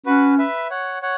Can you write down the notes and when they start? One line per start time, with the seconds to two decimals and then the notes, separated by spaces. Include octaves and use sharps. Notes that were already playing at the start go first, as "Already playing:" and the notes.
0.06 C#4 F#4 B4
0.38 B4 E5
0.70 C#5 F#5
1.02 C#5 F#5